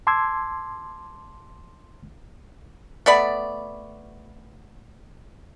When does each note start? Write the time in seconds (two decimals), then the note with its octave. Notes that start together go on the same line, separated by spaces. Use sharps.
0.07 A5 C6 D6 E6 G#6
3.06 A3 B3 D5 B5